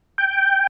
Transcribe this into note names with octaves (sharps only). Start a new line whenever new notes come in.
G5